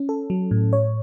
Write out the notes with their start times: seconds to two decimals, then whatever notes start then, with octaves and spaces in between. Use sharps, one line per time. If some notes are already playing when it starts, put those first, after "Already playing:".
Already playing: C#4
0.09 A4
0.30 F#3
0.51 A2
0.73 C#5